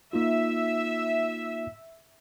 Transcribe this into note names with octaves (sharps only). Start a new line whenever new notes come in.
A#3 D#4 F4 E5